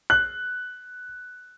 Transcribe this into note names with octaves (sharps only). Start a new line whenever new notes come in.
F#6